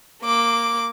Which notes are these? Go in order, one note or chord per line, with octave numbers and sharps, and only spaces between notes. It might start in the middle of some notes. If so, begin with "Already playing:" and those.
A#3 D6